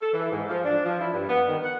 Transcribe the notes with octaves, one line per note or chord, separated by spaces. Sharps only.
A4
E3
G#2
F3
D4
F3
E4
G2
B3
D#3
F#5